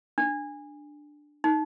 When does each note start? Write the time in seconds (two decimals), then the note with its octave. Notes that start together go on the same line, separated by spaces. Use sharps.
0.18 D4
1.44 D#4